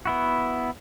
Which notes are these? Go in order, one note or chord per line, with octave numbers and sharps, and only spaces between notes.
B3 E4 F#4